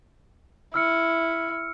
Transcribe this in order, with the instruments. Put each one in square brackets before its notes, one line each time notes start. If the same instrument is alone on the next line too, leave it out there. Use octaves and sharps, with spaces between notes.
[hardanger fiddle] E4 [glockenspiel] E6 F6 C#7